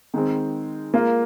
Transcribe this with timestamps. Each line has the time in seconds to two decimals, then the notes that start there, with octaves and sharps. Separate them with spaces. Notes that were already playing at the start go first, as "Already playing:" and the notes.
0.14 D#3 G#3 C4
0.94 G#3 A#3 F4 A#4